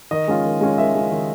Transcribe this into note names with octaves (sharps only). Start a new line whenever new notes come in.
D#3 D#5
G#3 C#4 F4
D#3
G#3 C#4 F4
D#3 E5
G#3 C#4 F4
D#3